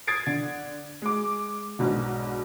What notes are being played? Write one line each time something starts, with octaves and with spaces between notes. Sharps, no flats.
D#6 G#6 A6 C7 D7
D3
G#3 D6
B1 G#2 B2 D3